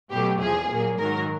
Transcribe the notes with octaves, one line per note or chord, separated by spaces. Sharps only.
B2 F#3 A3 G4
E2 C3 F3 G#4
A#2 F#3 A#3
G#2 D#3 F#3 A#4